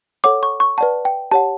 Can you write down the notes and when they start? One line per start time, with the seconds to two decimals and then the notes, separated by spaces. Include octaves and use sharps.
0.24 A4 C#5 F#5 D6
0.43 C#6
0.60 C#6
0.78 B4 D5 F#5 A5
1.05 G5
1.31 G4 C#5 F#5 A5